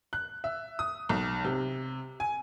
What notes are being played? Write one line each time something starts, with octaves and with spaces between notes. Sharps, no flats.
F#6
E5
D#6
B1
C3
G#5